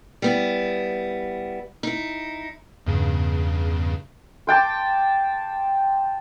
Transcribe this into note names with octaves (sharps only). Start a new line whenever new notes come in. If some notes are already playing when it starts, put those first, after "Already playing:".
G3 B3 E4
D#4 E4
E2 G2 C#3
C5 G5 A5 D6